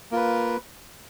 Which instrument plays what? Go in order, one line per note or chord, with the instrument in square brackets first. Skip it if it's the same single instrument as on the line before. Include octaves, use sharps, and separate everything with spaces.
[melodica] A#3 F4 B4